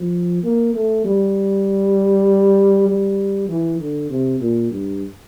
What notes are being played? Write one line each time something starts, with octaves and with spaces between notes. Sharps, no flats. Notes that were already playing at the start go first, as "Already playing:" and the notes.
Already playing: F3
A#3
A3
G3
G3
E3
D3
C3
A#2
G2